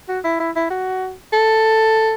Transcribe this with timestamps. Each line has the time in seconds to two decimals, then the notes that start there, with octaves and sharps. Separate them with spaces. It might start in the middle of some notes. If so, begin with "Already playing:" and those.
0.09 F#4
0.24 E4
0.40 E4
0.56 E4
0.71 F#4
1.33 A4